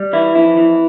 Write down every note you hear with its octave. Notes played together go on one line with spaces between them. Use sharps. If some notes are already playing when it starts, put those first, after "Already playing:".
Already playing: G3
E3 E4
F2 E4
E3